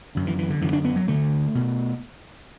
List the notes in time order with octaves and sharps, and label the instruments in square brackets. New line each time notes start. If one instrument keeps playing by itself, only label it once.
[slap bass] F#2 D3
E3
E3
D3
F#2 D3 E3
D4
B3
F#3
D2 D3 A3
B2